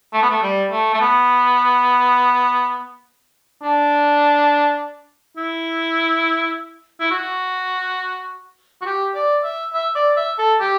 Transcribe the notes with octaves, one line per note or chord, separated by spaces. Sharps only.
A3
B3
A3
G3
A3
A3
B3
D4
E4
E4
F#4
F#4
G4
D5
E5
E5
D5
E5
A4
G4